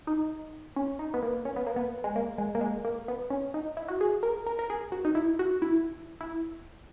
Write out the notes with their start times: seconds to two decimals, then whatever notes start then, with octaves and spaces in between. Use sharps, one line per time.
0.07 D#4
0.76 C#4
0.99 D#4
1.14 B3
1.23 A#3
1.45 C#4
1.56 B3
1.67 A#3
1.76 B3
2.04 G#3
2.16 A#3
2.38 G#3
2.55 A#3
2.61 G#3
2.85 A#3
3.08 B3
3.30 C#4
3.54 D#4
3.77 E4
3.88 F#4
4.01 G#4
4.23 A#4
4.47 A#4
4.59 A#4
4.70 G#4
4.92 F#4
5.05 D#4
5.15 E4
5.39 F#4
5.62 E4
6.21 E4